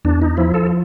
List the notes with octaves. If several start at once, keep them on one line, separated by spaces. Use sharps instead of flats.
E2 D4
D#4
F3 E4
A4